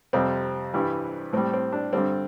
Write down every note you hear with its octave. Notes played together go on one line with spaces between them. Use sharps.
F2 C3 G3 C4
G2 E3 G3
A2 G3 C4
C4
D4
G2 D3 G3 C4